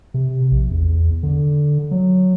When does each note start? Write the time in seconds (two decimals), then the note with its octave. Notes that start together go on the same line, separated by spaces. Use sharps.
0.14 C3
0.51 A#1
0.71 E2
1.23 D3
1.91 F#3